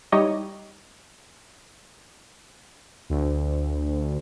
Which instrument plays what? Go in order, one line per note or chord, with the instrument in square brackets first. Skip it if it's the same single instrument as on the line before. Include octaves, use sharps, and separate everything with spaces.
[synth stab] G3 D#4 E4 G4 C#5 D#5
[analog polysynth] D2